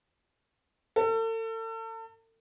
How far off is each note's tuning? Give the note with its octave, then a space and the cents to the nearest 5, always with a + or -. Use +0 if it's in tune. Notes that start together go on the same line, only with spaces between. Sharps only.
A4 +40